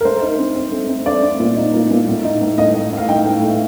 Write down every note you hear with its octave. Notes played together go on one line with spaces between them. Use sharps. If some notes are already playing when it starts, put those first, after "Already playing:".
A#4
A3 C5
D#4
C4
C4
A3
C4
A3 D5
C4
A#2
D#4
A#2
A#2
A2
D#4
A2
A2 D#5
A2
A2
F5
D#4 G5
A2
A3